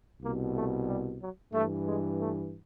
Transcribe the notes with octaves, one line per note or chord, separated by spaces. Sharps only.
C2 B2 A#3
A3
G3
F#3
G2 E3 A3
G#3
A3